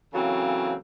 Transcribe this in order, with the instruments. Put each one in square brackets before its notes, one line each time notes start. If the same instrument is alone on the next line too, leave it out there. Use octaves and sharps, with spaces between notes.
[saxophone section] C#3 E3 F#3 A#3 C4 A4